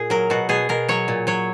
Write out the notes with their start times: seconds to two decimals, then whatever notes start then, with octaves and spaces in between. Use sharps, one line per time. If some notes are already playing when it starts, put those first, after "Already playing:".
Already playing: A#2 G#4
0.10 F#3 A#4
0.30 B2 F#4
0.49 B2 G#4
0.69 B2 A#4
0.89 F#3 C#5
1.08 A#2
1.27 F#3 C#5